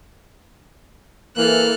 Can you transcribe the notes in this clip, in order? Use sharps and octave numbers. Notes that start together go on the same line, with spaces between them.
E3 A#3 A4 F6 F#6